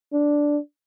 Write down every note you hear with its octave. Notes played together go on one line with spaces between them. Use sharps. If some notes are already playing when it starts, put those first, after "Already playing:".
D4